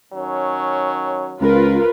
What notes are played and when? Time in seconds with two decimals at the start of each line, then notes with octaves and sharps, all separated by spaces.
0.13 D#3 F#3 C#4
1.41 C#2 F4 A#4 B4